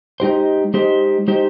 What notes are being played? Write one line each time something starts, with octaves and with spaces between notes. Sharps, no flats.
G#3 D#4 G4 C5
G#3 D#4 G4 C5
G#3 D#4 G4 C5